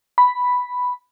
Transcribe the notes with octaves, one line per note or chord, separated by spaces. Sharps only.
B5